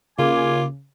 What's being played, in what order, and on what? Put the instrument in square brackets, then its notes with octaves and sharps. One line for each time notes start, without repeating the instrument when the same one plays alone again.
[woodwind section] D#2 G#5 D6 [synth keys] C#3 [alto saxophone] A#3 [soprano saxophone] F4